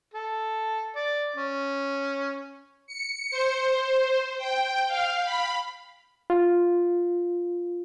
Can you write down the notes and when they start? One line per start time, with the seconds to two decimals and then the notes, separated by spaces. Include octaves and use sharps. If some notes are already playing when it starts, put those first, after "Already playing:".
0.14 A4
0.96 D5
1.36 C#4
2.87 C#7
3.31 C5
4.38 G5
4.88 F5
5.23 B5
6.30 F4